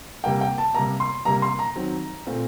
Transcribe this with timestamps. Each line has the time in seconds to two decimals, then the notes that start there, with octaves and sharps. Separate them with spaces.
0.24 C3 G3 A#3 G5
0.41 G5
0.58 A5
0.75 C3 G3 A#3 A#5
1.00 C6
1.25 C3 G3 A#3 A#5
1.42 C6
1.59 A#5
1.76 D#3 F#3 C4
2.27 A#2 A3 C4